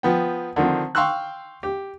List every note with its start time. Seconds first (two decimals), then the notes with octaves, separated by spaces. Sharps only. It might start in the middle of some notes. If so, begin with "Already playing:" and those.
0.03 F3 B3 G5
0.56 D3 D#3 F3 C4
0.95 F5 G5 C6 C#6 E6 F#6
1.63 G4